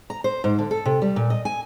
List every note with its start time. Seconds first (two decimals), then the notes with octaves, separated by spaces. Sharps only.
0.10 A#5
0.24 C5
0.44 G#2
0.59 D3
0.71 A4
0.85 C3
1.02 G3
1.16 A#2
1.30 D#5
1.45 G#5